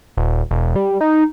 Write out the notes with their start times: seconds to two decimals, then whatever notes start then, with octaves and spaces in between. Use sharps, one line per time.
0.17 D#1
0.51 E1
0.76 G3
1.01 D#4